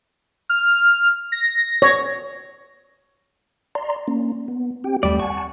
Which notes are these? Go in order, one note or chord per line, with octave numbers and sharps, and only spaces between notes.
F6
A#6
C#5
D5 A#5 C6
A#3 C#4
B3
C4 G4 G5
D#2 G3 A3 D5
F#5 G#5 A5 C#6